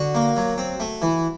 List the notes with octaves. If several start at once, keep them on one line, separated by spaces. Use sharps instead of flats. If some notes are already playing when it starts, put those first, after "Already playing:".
Already playing: D3 F#4
A#3
F#3
C4
A3
E3